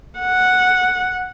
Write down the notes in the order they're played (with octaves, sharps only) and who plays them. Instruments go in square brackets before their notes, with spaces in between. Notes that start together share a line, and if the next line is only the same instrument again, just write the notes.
[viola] F#5